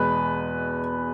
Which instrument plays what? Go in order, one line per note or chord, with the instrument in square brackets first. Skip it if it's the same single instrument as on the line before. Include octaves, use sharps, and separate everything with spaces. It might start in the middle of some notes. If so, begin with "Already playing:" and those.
Already playing: [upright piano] E2 B2 G#3 B4